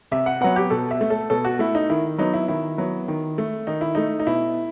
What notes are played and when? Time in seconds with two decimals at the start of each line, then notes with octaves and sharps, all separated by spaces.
0.11 C3 E5
0.26 F#5
0.41 F#3 B3 F#5
0.56 G4
0.70 B2 A4
0.91 E5
1.01 A3
1.10 A4
1.30 B2 A4
1.45 F#4
1.59 A3 E4
1.75 D#4
1.89 D#3 E4
2.18 F#3 B3 D#4
2.34 E4
2.48 D#3 E4
2.78 F#3 B3
3.08 D#3
3.38 A3
3.67 D#3 D#4
3.81 E4
3.95 A3 D#4
4.20 D#4
4.27 B2 E4